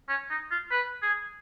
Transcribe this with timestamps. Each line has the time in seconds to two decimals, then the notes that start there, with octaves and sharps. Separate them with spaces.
0.09 C#4
0.30 D#4
0.51 F4
0.71 B4
1.02 G#4